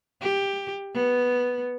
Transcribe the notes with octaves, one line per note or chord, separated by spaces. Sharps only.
G4
B3